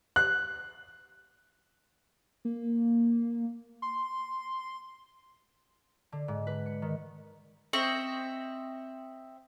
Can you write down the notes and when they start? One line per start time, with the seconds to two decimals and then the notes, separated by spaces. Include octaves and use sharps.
0.16 F#6
2.45 A#3
3.82 C6
6.12 D3
6.28 G#2
6.47 B4
6.66 C#7
6.82 D#3
7.73 C4 D#5 E5 C#6